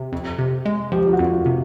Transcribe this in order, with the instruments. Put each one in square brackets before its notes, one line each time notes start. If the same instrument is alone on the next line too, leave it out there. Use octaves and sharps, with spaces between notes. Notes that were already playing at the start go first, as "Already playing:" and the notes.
Already playing: [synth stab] C3
F2
C3
G#3
[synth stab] F3 [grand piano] G4
[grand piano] F4
F#4
[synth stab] F2
[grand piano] F4
[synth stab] C3